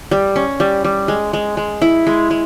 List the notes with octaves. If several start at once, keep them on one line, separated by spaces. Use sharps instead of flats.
G3
C#4
G3
G3
G#3
G#3
G#3
E4
G#3
G#3